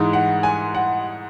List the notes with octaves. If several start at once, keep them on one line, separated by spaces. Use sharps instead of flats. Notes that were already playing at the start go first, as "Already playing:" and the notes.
Already playing: G#2 E3 G#3 D#4
F#5
G#5
F#5